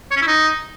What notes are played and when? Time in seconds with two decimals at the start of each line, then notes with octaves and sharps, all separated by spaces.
0.11 C#5
0.16 C#4
0.22 E4
0.27 D#4